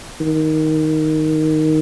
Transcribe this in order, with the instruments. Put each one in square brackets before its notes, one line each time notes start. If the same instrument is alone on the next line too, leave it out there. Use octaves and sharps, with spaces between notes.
[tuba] D#3